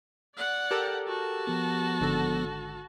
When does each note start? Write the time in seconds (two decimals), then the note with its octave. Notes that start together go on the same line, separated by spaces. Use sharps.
0.35 D5 F#5
0.71 G4 A4 A#4
1.07 F#4 A5
1.47 F3 B3
2.01 G#1 D3 A4